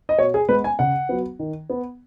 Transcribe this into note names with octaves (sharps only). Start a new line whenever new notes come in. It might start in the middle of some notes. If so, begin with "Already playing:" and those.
D#5
B2 C#5
G#4
G#3 B3 B4
G#5
C#3 F#5
F#3 B3
D#3
B3